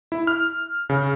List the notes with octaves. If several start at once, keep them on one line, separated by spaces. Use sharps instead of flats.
E4
F6
C#3